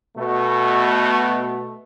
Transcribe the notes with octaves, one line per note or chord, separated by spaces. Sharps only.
B2 A3